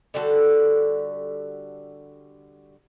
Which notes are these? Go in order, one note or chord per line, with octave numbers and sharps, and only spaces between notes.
D3 G3 F#4 A4